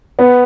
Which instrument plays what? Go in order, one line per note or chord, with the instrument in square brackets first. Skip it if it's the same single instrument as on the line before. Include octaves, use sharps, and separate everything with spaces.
[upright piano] B3